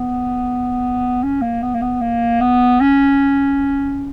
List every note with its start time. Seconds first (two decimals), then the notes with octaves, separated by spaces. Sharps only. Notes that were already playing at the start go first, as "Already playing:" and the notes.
Already playing: B3
1.23 C#4
1.41 A#3
1.62 B3
1.74 A#3
1.82 B3
2.01 A#3
2.41 B3
2.80 C#4